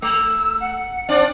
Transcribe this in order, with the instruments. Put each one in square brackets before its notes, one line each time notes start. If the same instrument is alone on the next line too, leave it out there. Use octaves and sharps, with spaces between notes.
[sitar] A3 [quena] E6
[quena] F#5
[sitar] C4 D4 D5